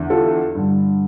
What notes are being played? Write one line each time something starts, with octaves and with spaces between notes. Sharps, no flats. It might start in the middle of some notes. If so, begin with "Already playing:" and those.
Already playing: E2 D3
F4 A4
G2 D3